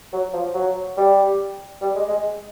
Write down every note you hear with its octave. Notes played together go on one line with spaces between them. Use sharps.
F#3
F3
F#3
G3
G3
G#3
G#3